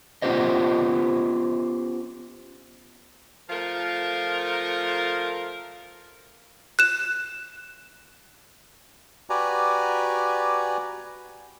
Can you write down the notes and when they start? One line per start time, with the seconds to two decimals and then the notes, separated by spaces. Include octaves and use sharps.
0.22 B3 C#4 F4 G4 C5 D#5
3.50 F3 A3 F4 A#4
6.79 F#6 E7
9.30 F#4 G4 B4 D5 G#5 A#5